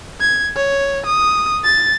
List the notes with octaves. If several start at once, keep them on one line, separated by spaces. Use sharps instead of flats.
G#6
C#5
D#6
A6